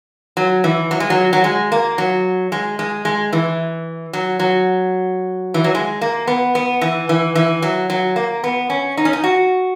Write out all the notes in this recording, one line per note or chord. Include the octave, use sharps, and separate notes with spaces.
F#3
E3
F#3
G#3
F#3
F#3
G#3
A#3
F#3
G#3
G#3
G#3
E3
F#3
F#3
E3
F#3
G#3
A#3
B3
B3
E3
E3
E3
F#3
F#3
A#3
B3
C#4
D#4
C#4
D#4
F#4